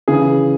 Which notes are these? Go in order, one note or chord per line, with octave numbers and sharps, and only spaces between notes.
C#3 E3 G#4